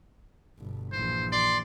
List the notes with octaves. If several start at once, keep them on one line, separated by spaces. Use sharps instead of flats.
G1 B2
A#1 E3 C5
D5 C6